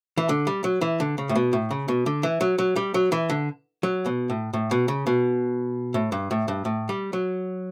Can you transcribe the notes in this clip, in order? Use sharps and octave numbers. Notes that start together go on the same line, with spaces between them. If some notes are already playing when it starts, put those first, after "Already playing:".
E3
D3
G3
F#3
E3
D3
C#3
A2
B2
A2
C#3
B2
D3
E3
F#3
F#3
G3
F#3
E3
D3
F#3
B2
A2
A2
B2
C#3
B2
A2
G2
A2
G2
A2
G3
F#3